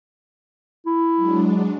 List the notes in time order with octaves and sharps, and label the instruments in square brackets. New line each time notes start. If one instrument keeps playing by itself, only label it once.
[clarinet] E4
[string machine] F#3 G#3 D4